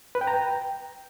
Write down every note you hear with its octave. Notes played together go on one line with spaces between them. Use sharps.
B4
G5
A#5
G5